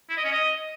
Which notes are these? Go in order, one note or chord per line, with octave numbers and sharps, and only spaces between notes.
E4
D#5
C#4
D#5